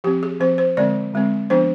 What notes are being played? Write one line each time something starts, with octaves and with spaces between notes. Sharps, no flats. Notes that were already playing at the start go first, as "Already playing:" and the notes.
F3 C4 G4
G#4
F3 C4 C5
C5
D3 G#3 C4 D5
D3 G#3 C4
F3 B3 D4 C5